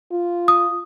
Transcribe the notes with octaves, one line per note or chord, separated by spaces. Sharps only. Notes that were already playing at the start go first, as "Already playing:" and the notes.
F4
D#6